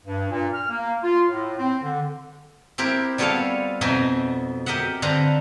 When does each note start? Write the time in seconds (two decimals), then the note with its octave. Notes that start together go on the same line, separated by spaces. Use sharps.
0.06 G2
0.31 A#2
0.54 F6
0.69 A#3
1.03 F4
1.29 A2
1.57 C4
1.83 D3
2.78 C4 E4 G4 A#4
3.18 G3 B3 F4 A4 C#5 F5
3.81 F2 B2 D#4 F#4 E5 G#5
4.66 G4 A#4 D#5 E5 F#5
5.02 D3 C4 B4 F5 A#5